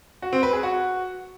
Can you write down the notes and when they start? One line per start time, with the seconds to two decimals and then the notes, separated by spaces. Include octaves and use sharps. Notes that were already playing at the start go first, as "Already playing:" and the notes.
0.22 F#4
0.33 C4
0.43 B4
0.53 G#4
0.63 F#4